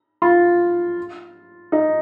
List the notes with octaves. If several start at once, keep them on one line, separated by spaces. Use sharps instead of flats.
F4
D#4